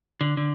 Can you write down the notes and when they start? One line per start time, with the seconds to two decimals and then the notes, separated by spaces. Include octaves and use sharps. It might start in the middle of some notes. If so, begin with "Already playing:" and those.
0.21 D3
0.37 D3